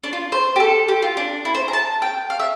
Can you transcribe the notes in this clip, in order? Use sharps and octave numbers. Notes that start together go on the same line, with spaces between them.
D4
F4
C5
G4
A4
G4
F4
D4
E4
C5
A#5
A5
G5
F5
E5